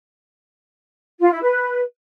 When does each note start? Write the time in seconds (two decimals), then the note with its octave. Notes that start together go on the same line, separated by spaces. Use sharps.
1.20 F4
1.31 E4
1.41 B4